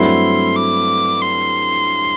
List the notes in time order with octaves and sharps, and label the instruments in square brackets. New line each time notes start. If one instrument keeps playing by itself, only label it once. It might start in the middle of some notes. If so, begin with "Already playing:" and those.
Already playing: [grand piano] G2 F#3 A3 C4 E4 [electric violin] C6
[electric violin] D6
C6